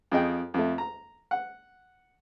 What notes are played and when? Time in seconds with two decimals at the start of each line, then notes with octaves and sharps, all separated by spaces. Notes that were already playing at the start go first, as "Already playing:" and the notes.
0.12 F2 G#4 D#5 G5
0.54 F2 A3
0.78 A#5
1.31 F#5